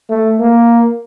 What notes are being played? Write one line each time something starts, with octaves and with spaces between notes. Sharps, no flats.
A3
A#3